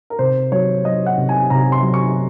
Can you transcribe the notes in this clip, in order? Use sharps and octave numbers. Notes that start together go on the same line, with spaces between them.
A#4
C3 C5
F#3 C#5
F#3 D#5
F#5
C3
G#5
C3 A#5
C6
F#3
C#6